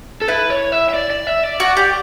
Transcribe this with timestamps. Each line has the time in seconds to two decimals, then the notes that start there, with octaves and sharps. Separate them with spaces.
0.22 A4
0.28 E4 B4
0.50 C#5
0.72 E5
0.89 E5
0.94 D5
1.10 D5
1.27 E5
1.44 D5
1.60 F#4
1.77 G4